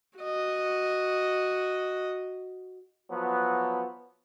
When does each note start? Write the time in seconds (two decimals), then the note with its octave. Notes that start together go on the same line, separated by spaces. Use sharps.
0.19 F#4 D#5
3.11 F3 F#3 B3